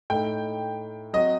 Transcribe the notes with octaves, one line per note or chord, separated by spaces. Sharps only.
A2 A3 D#4 G5
F#3 C4 F#4 D#5